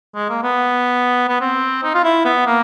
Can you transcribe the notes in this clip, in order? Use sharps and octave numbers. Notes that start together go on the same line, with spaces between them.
G#3
A#3
B3
B3
C4
D#4
F4
E4
B3
A#3